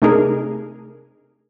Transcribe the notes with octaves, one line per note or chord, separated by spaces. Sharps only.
C3 A3 D4 D#4 G#4 A#4